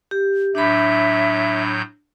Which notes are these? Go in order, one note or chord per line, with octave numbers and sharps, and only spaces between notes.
G4
A2 F#3 D4 E5 B5 G6